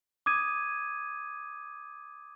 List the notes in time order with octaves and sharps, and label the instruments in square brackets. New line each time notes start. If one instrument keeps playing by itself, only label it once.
[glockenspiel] D6 D#6 G#6 D#7